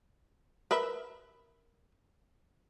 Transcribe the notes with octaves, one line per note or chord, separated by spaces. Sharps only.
A#4 B4 E5